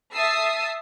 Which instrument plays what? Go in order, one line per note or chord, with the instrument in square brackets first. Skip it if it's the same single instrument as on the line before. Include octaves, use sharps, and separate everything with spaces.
[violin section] E5 A5 D#6 E6 C7